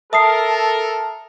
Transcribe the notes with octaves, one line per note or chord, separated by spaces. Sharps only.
A4 A#4 E5 A5 D#6 C7